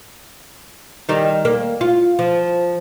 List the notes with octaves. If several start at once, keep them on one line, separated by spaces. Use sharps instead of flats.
D#3 G3 D#4
A#3
F4
F3